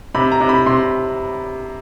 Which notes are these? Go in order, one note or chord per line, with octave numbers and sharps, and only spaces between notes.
C3 B5
A#5
C3
B5
C3 C6